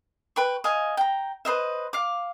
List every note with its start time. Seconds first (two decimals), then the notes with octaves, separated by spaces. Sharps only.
0.36 B4 G5 C#6
0.64 D#5 F5 G#5
0.97 G5 A#5
1.45 B4 C5 D#5 E5
1.93 F5 D6